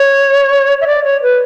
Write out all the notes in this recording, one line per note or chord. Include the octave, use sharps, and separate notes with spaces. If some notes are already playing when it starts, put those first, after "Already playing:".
Already playing: C#5
E5
D5
C#5
B4